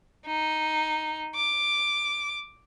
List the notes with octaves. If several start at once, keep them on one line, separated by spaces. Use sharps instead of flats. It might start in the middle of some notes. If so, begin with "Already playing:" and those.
D#4
D6